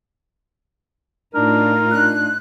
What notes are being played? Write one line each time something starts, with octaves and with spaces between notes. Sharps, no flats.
A2 D4 D#4 F4 A#4
D4 F#6